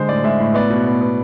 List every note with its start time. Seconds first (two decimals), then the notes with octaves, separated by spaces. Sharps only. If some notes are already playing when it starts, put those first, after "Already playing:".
Already playing: D3 G#3 C5
0.08 A2 D5
0.24 G#3 E5
0.40 A2
0.54 B3 D5
0.70 B2
0.86 B3
1.01 B3